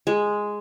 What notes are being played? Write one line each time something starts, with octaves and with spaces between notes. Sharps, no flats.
G#3